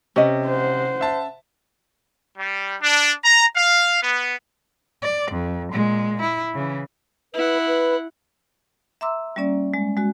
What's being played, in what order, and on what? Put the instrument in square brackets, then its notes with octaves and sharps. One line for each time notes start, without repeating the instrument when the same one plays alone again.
[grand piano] C3 [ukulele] C#4 D#5
[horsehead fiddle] C5 F#5
[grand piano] E5 A5
[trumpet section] G3
D4
A#5
F5
B3
[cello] D5
F2
A#2 G#3
E4
C#3 E3
[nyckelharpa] E4 F#5 [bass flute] B4
[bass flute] B4
[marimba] E5 A#5 C6 D6 E6
G3 A#3 C#4 D5
G#3
G#3 F#4